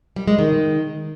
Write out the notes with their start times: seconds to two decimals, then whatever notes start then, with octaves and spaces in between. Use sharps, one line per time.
0.16 G3
0.28 G#3
0.39 D#3